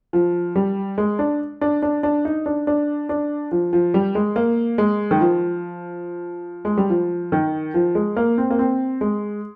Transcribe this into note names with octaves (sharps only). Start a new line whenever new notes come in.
F3
G3
G#3
D4
D4
D4
D4
D#4
D4
D4
D4
F3
F3
G3
G#3
A#3
G#3
D#3
F3
G#3
G3
F3
D#3
F3
G#3
A#3
C4
A#3
C4
G#3